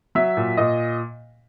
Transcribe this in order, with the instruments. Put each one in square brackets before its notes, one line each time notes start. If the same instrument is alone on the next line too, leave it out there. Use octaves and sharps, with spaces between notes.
[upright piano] F#3 E5
A#2
A#2 D#5